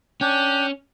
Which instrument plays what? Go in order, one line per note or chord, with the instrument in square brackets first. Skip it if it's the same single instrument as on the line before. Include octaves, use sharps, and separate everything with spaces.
[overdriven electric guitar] C#4 [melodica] D4 G5